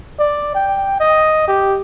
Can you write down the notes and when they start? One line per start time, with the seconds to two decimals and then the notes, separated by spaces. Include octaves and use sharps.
0.19 D5
0.55 G5
1.00 D#5
1.47 G4